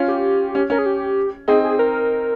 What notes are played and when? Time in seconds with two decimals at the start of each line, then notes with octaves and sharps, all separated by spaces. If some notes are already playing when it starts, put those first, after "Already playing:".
Already playing: C#4 F4
0.08 G4
0.55 C#4
0.70 C#4 A#4
0.79 G#4
0.86 G4
1.48 C4 D#4 G#4
1.64 G#4
1.79 A#4